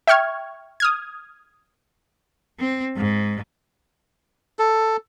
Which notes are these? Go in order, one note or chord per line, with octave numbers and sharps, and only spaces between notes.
E5 G5 C#6 F6 G#6
D#6 F6 G#6
C4
G#2
A4